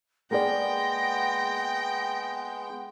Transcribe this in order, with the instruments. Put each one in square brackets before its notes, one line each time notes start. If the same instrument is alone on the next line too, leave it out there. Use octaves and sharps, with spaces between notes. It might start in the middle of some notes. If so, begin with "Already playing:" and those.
[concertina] G#3 B3 [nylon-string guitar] A#3 G#4 D5 [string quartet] G5 [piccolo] A#6